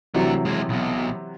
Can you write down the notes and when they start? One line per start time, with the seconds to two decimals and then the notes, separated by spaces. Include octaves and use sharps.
0.14 C3 E3 F#3 A3 D4
0.45 G#3 E4
0.69 B1 B2